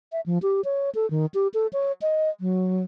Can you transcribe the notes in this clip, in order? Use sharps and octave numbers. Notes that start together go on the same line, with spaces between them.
E5
F3
G4
C#5
A4
D#3
G4
A4
C#5
D#5
F#3